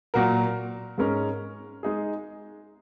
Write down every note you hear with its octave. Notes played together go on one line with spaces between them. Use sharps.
A#2 F#3 A#3 F#4 A#4
G#2 G#3 C#4 A#4
G#3 D#4 G#4